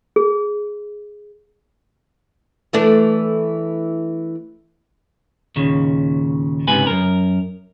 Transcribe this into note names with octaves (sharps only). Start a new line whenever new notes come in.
G#4
E3 A3 D4
D#2 A#2 C#3
C#2 G#2 C3 B4 G#5
F#2 A#4